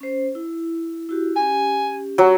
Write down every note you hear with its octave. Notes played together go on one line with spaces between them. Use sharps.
C#4 C5
E4
E4 F#4 G4
C#4 G4 G#5
F#3